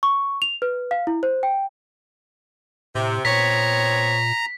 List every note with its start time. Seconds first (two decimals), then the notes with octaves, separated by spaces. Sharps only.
0.03 C#6
0.42 F7
0.62 B4
0.91 F5
1.07 E4
1.23 C5
1.43 G5
2.95 A2 C3
3.25 A#2 B3 C4 C#5 A#5 B6